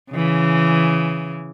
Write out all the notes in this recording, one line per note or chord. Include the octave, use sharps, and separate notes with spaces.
C#3 E3